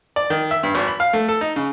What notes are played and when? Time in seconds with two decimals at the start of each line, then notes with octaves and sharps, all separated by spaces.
0.16 D5
0.30 D#3
0.51 E5
0.63 G2
0.75 G#1
0.88 B5
1.00 F5
1.13 A3
1.29 A4
1.41 D#4
1.56 C#3